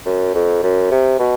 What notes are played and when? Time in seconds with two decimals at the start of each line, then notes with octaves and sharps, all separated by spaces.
0.06 F#2
0.34 F2
0.63 F#2
0.91 C3
1.19 B2